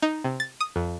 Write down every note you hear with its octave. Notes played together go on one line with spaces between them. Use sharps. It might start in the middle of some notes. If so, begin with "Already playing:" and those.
D#4
C3
A6
D#6
F2